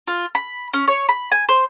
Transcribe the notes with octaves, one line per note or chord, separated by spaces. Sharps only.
F4
B5
C#4
C#5
B5
G#5
C5